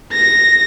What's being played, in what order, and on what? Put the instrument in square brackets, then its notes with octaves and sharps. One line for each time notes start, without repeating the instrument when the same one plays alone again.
[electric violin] A#6